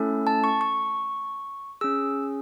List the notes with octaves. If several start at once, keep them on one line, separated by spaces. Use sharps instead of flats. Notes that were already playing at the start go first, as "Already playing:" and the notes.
Already playing: A3 C#4 E4 A4
A5
C#6
C#6
C#4 G#4 E6